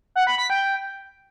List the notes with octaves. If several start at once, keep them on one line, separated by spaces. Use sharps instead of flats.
F#5
B5
B6
G5